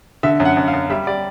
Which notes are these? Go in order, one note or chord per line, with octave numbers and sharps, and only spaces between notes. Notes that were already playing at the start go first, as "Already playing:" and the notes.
D3 E5
F#2
F#5
F#2
F5
F#2
G3 E5
G3 D5